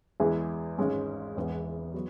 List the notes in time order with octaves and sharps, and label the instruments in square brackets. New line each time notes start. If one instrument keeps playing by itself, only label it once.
[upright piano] E2 E3 G#3 E4 G#4
G#1 G#2 G#3 C#4
E1 E2 E3 B3 E4
F#3 B3